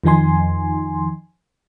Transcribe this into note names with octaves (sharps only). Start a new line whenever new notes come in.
F2 D#3 F3 D#4 G#5 C6